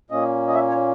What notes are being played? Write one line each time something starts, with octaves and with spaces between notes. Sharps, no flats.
A#2 A#3 C#4 D#5
D#5
E5
C#5